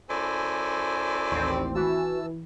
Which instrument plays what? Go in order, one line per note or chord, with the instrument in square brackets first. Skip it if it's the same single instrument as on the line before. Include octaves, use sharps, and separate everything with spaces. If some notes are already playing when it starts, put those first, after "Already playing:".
[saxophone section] F#2 E4 D5 [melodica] A4 C5 G#5
[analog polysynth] A1 D#2 C4
[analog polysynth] E3 [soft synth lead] F#4 [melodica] A5 E6